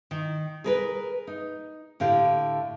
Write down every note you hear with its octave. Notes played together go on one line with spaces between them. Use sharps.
D#3
G#4 A#4 B4
D#4
A2 D3 G4 F5